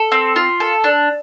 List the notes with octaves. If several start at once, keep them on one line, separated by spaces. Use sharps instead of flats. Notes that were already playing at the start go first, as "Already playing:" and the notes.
Already playing: A4
C4
F4
A4
D4